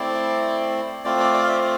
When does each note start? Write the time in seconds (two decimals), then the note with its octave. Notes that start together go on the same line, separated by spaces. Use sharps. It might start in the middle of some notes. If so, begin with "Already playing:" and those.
Already playing: A3 C4 E4 D5
1.04 A3 C4 F4 D5
1.20 D5
1.34 D5
1.43 F5
1.48 E5